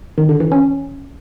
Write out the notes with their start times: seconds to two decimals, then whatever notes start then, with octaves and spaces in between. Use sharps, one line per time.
0.18 D#3
0.29 D3
0.40 E3
0.52 C#4